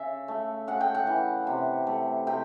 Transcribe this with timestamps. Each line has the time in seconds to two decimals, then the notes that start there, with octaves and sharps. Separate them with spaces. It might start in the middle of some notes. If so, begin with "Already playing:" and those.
Already playing: C#3 E5
0.28 A3
0.67 C#3 F#5
0.80 G5
0.95 F#5
1.07 E3
1.47 C3
1.87 A3
2.27 C3 G5